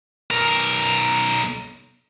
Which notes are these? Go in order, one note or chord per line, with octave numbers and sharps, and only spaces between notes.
B1 A#4